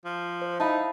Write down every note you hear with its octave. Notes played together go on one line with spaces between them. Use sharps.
F3
C5
D#4 E4 F5 A5 B5